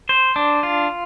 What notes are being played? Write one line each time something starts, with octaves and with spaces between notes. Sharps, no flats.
C5
D4
F4